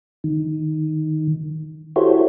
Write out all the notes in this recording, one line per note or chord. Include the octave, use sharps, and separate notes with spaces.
D#3
E4 F#4 G4 A4 C5 C#5